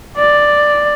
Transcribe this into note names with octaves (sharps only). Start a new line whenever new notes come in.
D5